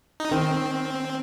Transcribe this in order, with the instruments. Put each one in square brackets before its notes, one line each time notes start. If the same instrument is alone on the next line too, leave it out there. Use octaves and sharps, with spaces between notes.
[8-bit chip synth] D#4
[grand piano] D#3 [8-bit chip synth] C4